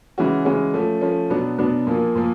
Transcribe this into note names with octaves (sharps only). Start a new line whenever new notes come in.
C#3 E3 G#3 C#4 F#4
C#3 E3 G#3 C#4 F#4
F3 A3 C#4
F3 A3 C#4
B2 F#3 B3 D4
B2 F#3 B3 D4
A#2 F3 A#3
A#2 F3 A#3